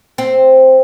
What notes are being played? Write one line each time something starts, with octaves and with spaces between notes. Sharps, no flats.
C4